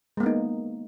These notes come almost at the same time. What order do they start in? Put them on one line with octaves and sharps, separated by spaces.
G#3 A#3 B3 D#4